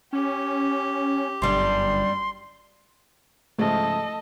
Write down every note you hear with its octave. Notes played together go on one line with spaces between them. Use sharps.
C#4 G4
G1 F#2 G3 D4 C6
G#2 C#3 F3 A3 A4 D#5